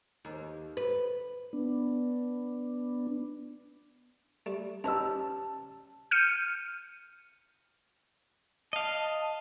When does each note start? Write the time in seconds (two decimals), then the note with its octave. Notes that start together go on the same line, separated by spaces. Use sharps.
0.25 D#2
0.77 B4
1.53 B3 D4
4.46 G3 A3
4.84 C#4 D#4 G4 B4 D#5 A5 A#5 E6
6.11 F6 G6 C#7 D#7
8.73 D#5 F5 A5